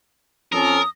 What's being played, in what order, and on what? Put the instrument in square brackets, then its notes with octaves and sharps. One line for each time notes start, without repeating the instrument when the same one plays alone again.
[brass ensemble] F2 C#4 A4 [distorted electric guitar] A#4 [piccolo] D#6